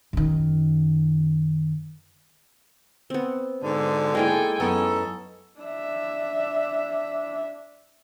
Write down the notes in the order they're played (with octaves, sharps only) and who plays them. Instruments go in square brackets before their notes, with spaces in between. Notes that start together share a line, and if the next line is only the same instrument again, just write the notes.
[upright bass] F#2 D#3
[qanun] B3 C4
[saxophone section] G#2 B2 D3
[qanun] G#3 A#3 E4 [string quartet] A4 G5 G#5
[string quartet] F#2 [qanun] B3 [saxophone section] C#4 D#4 A4
[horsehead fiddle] D4 E5